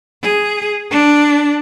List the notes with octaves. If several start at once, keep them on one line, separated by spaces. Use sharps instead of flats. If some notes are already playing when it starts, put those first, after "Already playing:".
G#4
D4